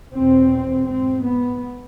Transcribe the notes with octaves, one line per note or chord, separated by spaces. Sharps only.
E2 B2 C4
G#2 C4
B3